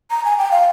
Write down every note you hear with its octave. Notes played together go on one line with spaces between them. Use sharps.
A#5
G#5
G5
F5